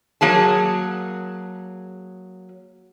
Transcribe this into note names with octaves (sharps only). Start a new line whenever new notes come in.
F#3 A#3 G#4 A5